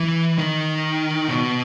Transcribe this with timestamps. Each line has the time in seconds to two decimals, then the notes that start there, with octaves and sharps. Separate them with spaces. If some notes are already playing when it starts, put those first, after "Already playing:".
Already playing: E3
0.38 D#3
1.28 B2